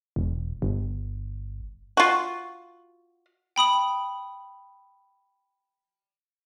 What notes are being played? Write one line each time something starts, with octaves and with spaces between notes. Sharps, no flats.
E1
G1
F4 F#4
G5 B5 D#6 F#7